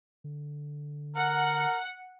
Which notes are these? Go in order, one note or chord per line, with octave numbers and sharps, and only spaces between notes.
D3
A#4 F#5